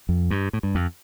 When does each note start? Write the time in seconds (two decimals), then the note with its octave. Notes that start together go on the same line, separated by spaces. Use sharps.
0.09 F2
0.31 G2
0.53 A2
0.63 G2
0.75 F2